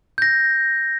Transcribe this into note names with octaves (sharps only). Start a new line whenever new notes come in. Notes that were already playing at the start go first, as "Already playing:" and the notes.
G6 A#6